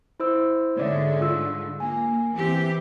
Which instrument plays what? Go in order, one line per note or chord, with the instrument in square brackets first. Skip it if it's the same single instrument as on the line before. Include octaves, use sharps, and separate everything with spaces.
[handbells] E4 C5 E6
[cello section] G#2 D3 G#3 [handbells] C#5 D5 E5
[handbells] F4 E6
[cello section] A#3 [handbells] G#5
[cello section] E3 C4 G4